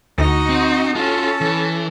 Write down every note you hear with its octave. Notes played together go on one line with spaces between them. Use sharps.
D2 D#4 F#4
C4
C#4 F4 F#4 A4
E3